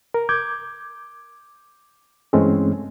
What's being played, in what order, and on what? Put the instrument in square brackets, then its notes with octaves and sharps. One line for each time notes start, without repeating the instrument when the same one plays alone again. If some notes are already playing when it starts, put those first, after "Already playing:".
[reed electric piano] A#4
D6 G6 G#6
G2 E3 G#3 A3 C4 C#4